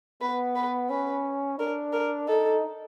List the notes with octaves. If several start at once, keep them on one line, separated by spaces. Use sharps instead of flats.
B3 B4
B4
C#4 B4
D4 A#4
A#4
D#4 A4